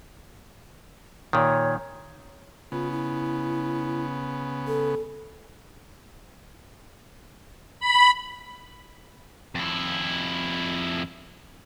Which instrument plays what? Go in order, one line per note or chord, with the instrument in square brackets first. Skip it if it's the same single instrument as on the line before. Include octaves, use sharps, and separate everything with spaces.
[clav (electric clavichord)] A#2 D#3 [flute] C#5
[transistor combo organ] C#3 B3 [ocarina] F4
[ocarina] E4
A4
[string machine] B5
[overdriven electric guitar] F2 E4